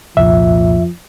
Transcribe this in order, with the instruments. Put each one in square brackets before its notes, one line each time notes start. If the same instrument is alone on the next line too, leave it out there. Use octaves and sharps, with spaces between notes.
[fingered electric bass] C2 A#2 [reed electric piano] F2 E5 [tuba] F3